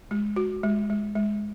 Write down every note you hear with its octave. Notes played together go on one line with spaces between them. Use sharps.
G#3
F#4
G#3
G#3
G#3